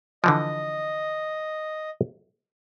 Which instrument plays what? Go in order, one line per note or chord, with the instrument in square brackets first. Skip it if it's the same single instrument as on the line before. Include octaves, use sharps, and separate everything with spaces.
[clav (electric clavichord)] D3 E3 F3 [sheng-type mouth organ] D#5